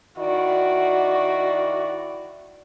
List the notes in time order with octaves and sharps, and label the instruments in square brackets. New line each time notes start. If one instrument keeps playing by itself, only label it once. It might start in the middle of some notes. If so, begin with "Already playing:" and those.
[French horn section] D#3 E4 D5 [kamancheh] F#4